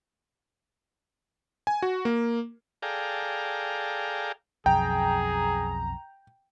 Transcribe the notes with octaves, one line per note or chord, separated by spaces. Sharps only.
G#5
F#4
A#3
G#4 A4 D5 F5 G5 A#5
B1 F2 G#4 G5 A#5